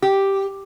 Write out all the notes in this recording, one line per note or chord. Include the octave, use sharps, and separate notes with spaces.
G4